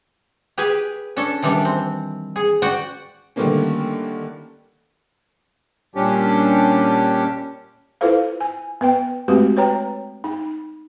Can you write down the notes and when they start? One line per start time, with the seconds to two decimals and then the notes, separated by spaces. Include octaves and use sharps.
0.58 G4 G#4 B4 G#5
1.16 C#4 D4 A4
1.42 D#3 E3 G3 D4
1.65 C4
2.36 G#4
2.62 F#4 D5 F#5 G5
3.36 D3 D#3 G3 A3 A#3 C#4
5.95 A#2 G3 C#4 D4 G4
8.01 E4 F4 A4 B4 C5 F5
8.40 G#5
8.81 B3 B4 G5
9.28 G#3 A3 C4 F#4 G4 B4
9.57 B4 C#5 G5 A#5
10.24 D#4